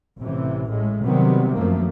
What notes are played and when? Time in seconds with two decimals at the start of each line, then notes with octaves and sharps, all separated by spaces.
0.19 A1 C3 E3
0.69 A2 G#3
1.04 C3 D#3 F#3 G3 B3 C4
1.57 F#2 F3 A3 A#3